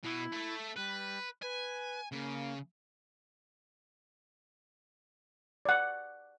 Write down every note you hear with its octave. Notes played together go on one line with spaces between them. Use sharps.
B2 B3 E4
A3 A4
G3 B4
B4 G#5
C#3 A#3
D5 F#5